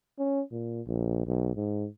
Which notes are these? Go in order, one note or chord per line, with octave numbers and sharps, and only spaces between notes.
C#4
A#2
A#1
B1
G#2